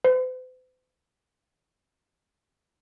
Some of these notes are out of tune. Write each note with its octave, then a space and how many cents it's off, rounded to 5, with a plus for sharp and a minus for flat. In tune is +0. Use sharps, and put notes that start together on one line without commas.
C5 -45